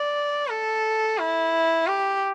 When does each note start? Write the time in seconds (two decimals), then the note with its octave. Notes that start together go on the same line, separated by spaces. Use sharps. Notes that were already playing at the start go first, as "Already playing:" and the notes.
Already playing: D5
0.50 A4
1.18 E4
1.87 G4